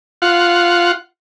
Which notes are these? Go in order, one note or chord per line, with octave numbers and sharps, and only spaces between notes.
F4 F#5